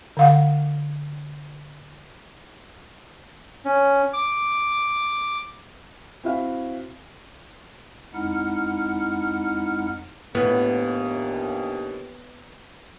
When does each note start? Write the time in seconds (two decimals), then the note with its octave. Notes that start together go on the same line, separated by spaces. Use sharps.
0.17 D3 F5 F#5
3.65 C#4
4.13 D6
6.24 C4 E4 F#4 E5 F5
8.14 F2 G#3 D#4 E4 F#5 F6
10.35 A#1 D#2 A2 B3